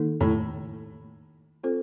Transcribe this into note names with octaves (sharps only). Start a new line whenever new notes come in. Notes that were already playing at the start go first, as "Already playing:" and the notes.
Already playing: D#3 A#3 D#4 A4
A2
C4 F4 A4 C5